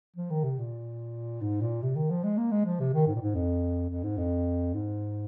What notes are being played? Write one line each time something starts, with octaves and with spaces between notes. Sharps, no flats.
F3
D#3
C3
A#2
G#2
A#2
C3
D#3
F3
G#3
A#3
G#3
F3
C3
D#3
G#2
A#2
G#2
F2
F2
G#2
F2
G#2